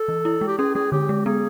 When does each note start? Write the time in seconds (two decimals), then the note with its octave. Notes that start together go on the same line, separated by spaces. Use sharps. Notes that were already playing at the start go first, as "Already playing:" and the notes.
Already playing: A4
0.08 E3
0.25 E4
0.41 G#3
0.47 G4
0.58 C#4 G#4
0.75 G#3 G#4
0.92 D3 G4
1.09 G#3
1.25 B3 G#4